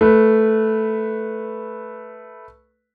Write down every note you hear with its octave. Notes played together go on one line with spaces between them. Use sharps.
A3 B4